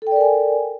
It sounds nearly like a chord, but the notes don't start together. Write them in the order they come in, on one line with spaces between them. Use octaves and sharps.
A4 G5 D5 A#4 G#5